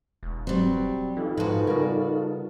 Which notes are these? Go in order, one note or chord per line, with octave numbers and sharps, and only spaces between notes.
E1
F#3 G3 C4
E3 D#4 F4 A4
G#2 F3 F#4 B4
C#3 G3 A#4